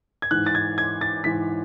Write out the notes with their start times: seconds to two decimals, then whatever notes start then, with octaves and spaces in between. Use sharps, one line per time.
0.22 G#6
0.31 G#2 E3 F#6
0.46 A6
0.55 G#6
0.78 G#6
1.01 A6
1.24 G#2 E3 B6